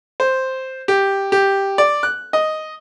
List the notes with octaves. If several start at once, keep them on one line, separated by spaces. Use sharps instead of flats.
C5
G4
G4
D5
F#6
D#5